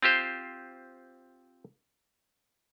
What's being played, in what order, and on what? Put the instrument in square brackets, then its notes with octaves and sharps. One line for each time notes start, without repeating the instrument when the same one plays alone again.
[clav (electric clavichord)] C4 F4 G4 C5